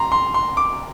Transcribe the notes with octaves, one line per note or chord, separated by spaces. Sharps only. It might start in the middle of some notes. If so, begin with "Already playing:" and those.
Already playing: A#5 C6
C6
C6
D6